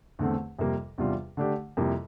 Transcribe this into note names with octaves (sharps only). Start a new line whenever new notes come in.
E2 D3 A3 C4
F2 C3 G3 A#3
E2 C3 G3 D4 F4
D3 A3 D4 G4
F2 C3 G3 A#3 E4